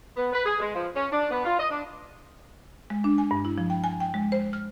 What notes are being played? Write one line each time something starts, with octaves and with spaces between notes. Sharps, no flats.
B3
B4
G#4
G#3
F3
C#4
D4
B3
F4
D#5
D4
G#3
D4
G#5
G2
E4
F3
G5
G#5
G5
G#3
C5
F6